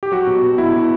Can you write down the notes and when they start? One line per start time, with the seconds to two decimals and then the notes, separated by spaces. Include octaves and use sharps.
0.03 G4
0.12 F#3 F#4
0.27 B2
0.43 B2
0.58 B3 E4
0.74 B2